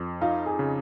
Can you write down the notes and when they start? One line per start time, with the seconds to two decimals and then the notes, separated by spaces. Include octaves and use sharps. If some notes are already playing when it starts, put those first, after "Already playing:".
Already playing: F2
0.21 D#4 F4
0.46 G#4
0.59 C#3